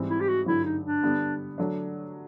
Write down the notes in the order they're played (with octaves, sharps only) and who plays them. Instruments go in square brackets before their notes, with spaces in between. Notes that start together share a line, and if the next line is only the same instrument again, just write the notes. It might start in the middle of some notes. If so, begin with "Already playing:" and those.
Already playing: [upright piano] G#2 E3 G3 C4
[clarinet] E4
G4
F#4
[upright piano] G2 D3 F#3 [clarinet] E4
[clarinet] D#4
D4
[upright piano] D3 G3 B3
D3 F#3 A3 D4